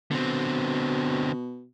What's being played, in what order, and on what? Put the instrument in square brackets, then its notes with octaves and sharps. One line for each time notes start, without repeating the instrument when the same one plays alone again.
[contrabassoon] B2 [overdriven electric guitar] D3 C4